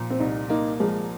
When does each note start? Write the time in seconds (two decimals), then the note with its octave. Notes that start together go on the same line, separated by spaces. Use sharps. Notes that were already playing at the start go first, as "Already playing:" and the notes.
Already playing: A#2 F3
0.10 C4
0.20 C2 D#4
0.49 A#3 D#4
0.80 F3 G#3